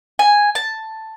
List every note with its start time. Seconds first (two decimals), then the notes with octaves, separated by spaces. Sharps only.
0.19 G#5
0.55 A5